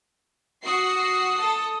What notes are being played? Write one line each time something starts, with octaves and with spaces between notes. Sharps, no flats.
F#4 D#6 C7
A4